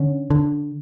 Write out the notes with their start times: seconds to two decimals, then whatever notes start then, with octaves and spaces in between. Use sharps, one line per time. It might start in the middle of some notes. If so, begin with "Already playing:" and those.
Already playing: D3 C#4
0.30 D3